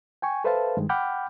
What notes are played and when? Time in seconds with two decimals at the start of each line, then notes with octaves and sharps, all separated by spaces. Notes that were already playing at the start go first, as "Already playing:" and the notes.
0.22 G5 G#5 C#6
0.44 A4 B4 C5 E5 F5 A5
0.77 G2 D#3 G#3
0.89 F#5 G5 B5 D6 F6 G6